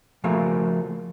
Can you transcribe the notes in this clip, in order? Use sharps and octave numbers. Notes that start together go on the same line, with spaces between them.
C#3 F3 A3 A#3 F#4 F5